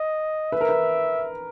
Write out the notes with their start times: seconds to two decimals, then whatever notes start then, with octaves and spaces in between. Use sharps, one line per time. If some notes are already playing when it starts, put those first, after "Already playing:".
Already playing: D#5
0.52 B4 E5
0.61 A#4
0.69 B4